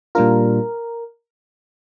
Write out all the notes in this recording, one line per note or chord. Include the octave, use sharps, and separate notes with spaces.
A#2 G3 D4 F4 A#4